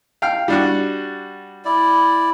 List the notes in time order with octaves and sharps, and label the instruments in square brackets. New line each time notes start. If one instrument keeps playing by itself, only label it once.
[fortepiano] F5 G5 F6
G3 D4 F#4
[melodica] E4 D5